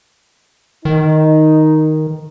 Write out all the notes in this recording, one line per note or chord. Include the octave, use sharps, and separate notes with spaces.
D#3 D#4